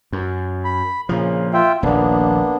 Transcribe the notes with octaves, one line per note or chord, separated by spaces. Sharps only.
F#2
B5
A#2 C#3 F3
F4 E5 G5
D#1 A#1 A#3 B3 D4